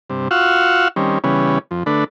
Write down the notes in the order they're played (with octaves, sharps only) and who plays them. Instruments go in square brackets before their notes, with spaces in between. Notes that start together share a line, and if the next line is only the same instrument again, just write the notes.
[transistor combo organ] G2 C3
F4 F#4 F5 F#5 C#6 E6
D#3 G3 C4 C#4
C#3 E3 G3 B3 C#4
F2
D3 A3 D4 B4